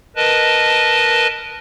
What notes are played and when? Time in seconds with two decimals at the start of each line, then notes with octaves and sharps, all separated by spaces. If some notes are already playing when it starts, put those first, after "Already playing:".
0.16 A#4 B4 D#5 A5